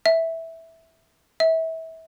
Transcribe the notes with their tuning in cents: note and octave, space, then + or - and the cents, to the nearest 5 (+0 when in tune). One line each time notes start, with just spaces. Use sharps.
E5 -10
E5 -25